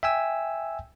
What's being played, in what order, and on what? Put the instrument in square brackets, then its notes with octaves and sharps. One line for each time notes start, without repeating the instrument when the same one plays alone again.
[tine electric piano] E5 G5 G#5 E6